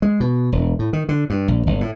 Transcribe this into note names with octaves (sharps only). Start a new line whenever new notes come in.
G#3
B2
E1
A2
D#3
D3
G2
A#1
G1
A2